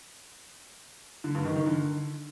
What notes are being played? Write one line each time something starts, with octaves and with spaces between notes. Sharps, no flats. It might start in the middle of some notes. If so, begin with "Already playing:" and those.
D3
G2
D#3
D#3
D3